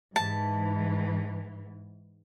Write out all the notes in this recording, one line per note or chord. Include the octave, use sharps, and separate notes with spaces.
G#2 E3 A5